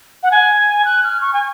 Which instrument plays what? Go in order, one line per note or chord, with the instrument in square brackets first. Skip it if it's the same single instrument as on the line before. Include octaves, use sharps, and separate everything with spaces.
[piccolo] F#5
G#5
F#6
F6
C#6
G#5